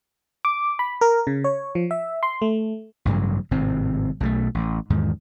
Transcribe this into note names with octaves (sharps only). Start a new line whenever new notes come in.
D6
B5
A#4
C#3
C#5
F3
E5
C6
A3
A1 G2 C#3 F#3
G#1 A2 C3 C4
B1 B2 E3 A3
A1
E2 G#2 D#3